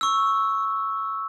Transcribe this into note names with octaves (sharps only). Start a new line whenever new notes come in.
C#6 E6